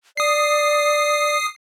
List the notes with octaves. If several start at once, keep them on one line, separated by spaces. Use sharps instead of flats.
D5 D#6 C7